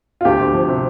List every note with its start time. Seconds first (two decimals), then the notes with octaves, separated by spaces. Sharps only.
0.21 F4
0.25 D2 G4
0.39 D2
0.53 F3
0.68 C3